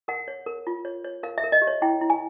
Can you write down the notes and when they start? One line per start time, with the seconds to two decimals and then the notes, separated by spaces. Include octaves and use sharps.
0.08 A#4 F#5
0.28 C#5
0.46 A#4
0.67 F4
0.85 C#5
1.04 C#5
1.23 A#4 F5
1.38 E5
1.44 A#4
1.52 D#5
1.62 G4
1.67 C#5
1.82 E4 G5
2.01 E4
2.10 G#5